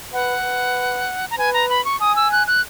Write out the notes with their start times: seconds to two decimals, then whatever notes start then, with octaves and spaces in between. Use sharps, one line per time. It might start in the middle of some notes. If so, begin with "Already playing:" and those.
0.13 B4 F#5
0.44 B4
1.31 A#5
1.38 B4 G#5
1.54 A#5
1.70 B5
1.85 C#6
2.00 G#5 D#6
2.16 E6
2.32 F#6
2.47 F#6